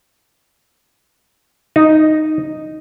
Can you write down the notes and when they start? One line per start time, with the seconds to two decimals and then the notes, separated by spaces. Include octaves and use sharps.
1.76 D#4